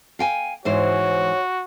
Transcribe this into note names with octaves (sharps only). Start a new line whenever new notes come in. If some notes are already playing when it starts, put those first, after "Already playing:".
F5 G5 G#5
G#2 E3 F#4 C5 C#5